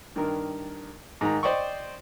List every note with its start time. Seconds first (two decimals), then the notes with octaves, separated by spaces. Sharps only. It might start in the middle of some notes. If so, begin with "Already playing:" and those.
0.16 G2 D#3 A#4
1.21 G#2 D#3 A#5
1.43 C5 D5 D#5 G5 C#6